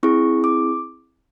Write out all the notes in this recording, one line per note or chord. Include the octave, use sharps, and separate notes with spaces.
C4 E4 G#4 C#6
D6